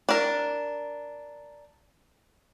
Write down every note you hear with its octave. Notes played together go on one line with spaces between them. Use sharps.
D4 A#4